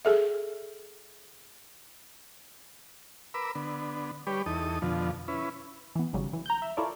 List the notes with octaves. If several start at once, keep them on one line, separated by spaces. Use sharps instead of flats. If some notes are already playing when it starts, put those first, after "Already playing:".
G#4 A4 E5
A#4 B4 B5 D6 E6
D3 B3
G3 G4 B4 C#5 D5
E2 D#4 A4 D#6
F2 B2 D3 F3
C#4 E4 B4
E3 B3
G#1 C#3 F#3 G3
E3
A#5 G6
E5
E4 F4 A4 A#4 C#5 D5